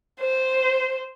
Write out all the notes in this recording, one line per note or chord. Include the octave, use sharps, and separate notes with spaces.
C5